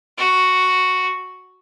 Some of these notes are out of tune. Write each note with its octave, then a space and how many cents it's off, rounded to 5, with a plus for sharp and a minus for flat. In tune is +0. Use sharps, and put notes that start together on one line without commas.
F#4 +0